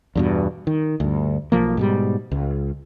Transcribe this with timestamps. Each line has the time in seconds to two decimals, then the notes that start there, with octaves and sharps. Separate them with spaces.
0.15 E2 G2 B2
0.67 D#3
1.00 D2 G2
1.52 B1 F3 A#3
1.77 G#2 B2 G3
2.31 C#2